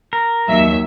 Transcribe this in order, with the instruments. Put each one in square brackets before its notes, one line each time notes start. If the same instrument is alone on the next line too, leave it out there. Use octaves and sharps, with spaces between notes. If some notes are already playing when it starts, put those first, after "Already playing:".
[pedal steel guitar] A#4
[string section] D#2 F#3 E5